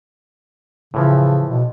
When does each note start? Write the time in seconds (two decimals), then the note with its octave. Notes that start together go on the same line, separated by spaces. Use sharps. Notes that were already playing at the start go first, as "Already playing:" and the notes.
0.94 A2 C#3 E3 F3
1.50 B2